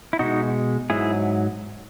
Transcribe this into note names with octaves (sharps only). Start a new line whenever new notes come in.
E4
B2 G#3 D#4 F#4
G#2 F#3 E4 G#4